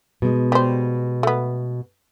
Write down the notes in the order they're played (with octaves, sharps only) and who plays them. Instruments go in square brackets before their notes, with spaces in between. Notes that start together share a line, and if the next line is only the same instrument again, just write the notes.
[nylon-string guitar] B2 G#3
[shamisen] G3 C5
A3 B3